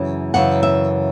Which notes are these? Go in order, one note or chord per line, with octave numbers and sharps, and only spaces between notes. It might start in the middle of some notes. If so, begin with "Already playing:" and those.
Already playing: F#2 C#3 E3
F#2 C#3 E3 F#5
E5